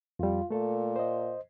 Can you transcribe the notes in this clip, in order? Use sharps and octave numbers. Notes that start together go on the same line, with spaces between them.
F2 G3 F4
A#2 A3 A4
C5 D#5